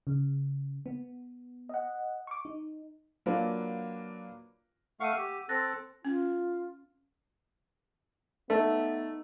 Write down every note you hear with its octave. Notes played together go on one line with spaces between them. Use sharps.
C#3
B3
D#5 F#5
C#6 D6
D#4
F#3 A#3 D4 F4 B4
A3 F5 F#5 C#6 E6 D#7
G4
C4 A4 F#6 A6 A#6
C#4 F4
A3 B3 D#4